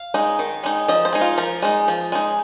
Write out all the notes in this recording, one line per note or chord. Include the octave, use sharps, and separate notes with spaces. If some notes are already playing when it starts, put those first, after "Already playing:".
Already playing: F5
G#3 D#4
D#3
G#3 D#4
F3 D#5
C5
G#3 D#4
F4
F3 A#4
G#3 D#4
F3
G#3 D#4